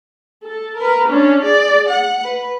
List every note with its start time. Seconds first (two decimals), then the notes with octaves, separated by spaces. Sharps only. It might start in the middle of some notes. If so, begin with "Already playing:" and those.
0.43 A4
0.77 A#4 B4
1.08 C#4 D4
1.43 G#4 D5
1.89 F#5
2.24 B4